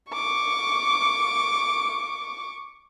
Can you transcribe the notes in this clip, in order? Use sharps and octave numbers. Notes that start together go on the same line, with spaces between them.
C#6 D6